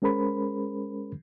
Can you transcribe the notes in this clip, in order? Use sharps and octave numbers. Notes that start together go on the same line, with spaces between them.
G#3 C#4 G#4 A#4 C5 B5